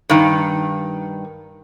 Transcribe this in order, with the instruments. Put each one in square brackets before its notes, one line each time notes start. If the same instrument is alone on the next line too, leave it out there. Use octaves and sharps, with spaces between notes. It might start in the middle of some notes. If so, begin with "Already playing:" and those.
[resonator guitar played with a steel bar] G2 D#3